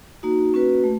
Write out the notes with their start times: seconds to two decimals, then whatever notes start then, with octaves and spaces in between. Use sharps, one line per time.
0.23 A#3 D#4 F#4
0.53 A#3 C#4 F#4 B4
0.84 A3